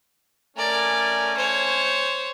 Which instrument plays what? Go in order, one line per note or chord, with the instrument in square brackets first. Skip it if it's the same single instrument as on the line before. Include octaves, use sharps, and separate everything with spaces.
[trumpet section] A3 C#4 G#5 [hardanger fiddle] A#4 D5
[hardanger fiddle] C5 C#5